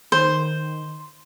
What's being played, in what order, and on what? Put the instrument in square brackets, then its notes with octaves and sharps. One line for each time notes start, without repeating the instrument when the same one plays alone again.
[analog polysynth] D#3 [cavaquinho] C5